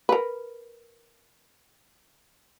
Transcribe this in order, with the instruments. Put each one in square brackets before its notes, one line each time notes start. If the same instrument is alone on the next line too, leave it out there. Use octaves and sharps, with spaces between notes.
[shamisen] A#4 B4